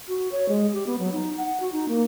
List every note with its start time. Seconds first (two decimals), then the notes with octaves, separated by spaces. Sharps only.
0.08 F#4
0.32 C#5
0.49 G#3
0.73 G4
0.87 B3
0.99 F#3
1.12 D#4
1.38 F#5
1.60 F#4
1.72 D#4
1.88 A#3